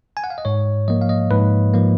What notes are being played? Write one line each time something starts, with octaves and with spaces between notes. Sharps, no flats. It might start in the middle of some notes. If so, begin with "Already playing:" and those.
G#5
F#5
F5
D#5
G#2 C#5
F3 A#3 D#5
F5
D#5
G#2 B4
F3 A#3